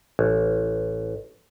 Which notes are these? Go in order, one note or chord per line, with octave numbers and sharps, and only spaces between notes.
A1